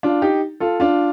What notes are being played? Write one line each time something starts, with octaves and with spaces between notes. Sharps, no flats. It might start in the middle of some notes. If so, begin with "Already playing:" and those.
D4 F4
D#4 G4
F4 A4
D4 F4